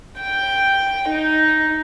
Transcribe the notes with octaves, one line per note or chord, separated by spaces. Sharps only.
G5
D#4